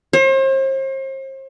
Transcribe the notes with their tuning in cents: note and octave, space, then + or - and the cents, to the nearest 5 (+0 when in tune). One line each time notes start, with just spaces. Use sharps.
C5 +40